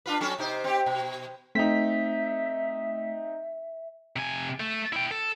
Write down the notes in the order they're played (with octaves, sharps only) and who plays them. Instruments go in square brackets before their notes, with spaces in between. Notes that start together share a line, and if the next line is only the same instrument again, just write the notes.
[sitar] D4 F4 B4
F#3 C#4 A4
C3 D#4 C5
C4 G4
B2
[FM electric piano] A3 B6 [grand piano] C4 D#4 [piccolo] E5
[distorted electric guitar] C3 G#5
A3
E4 G5
A4